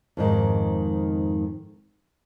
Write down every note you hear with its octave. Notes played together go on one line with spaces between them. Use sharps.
F2 G#2 D#3